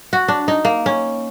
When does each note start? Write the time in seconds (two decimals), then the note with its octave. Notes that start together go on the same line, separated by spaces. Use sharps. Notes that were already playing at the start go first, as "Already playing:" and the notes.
0.13 F#4
0.28 D4
0.48 D#4
0.65 A#3
0.86 C#4